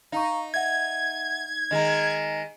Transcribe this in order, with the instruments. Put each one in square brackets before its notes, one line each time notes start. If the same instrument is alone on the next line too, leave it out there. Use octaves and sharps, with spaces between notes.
[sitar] D#4 [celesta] F5 A#5 C#6
[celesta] E5 F#5 [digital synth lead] G#6
[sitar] D#3 G#3 [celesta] D#5 A#5